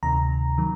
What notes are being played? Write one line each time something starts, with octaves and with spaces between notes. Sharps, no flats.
D2 C3 D#3 A#5
D#3 F#3